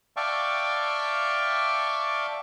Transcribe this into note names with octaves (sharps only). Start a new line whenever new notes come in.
D5 E5 F5 G5 A5 C#6